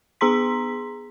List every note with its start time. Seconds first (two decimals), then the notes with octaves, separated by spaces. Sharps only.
0.21 B3 G#4 A#5 C6 B6